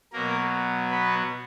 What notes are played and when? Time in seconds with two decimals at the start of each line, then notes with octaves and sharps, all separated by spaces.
0.12 B2 F#3 A#3 A#4
0.91 B3 B4